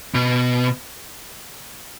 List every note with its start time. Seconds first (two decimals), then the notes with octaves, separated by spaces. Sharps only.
0.15 B2